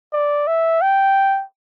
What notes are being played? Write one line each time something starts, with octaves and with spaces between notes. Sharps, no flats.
D5
E5
G5